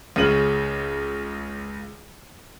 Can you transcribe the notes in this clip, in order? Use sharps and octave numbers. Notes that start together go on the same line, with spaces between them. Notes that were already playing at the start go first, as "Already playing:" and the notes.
C#2 C#3 D#7 F#7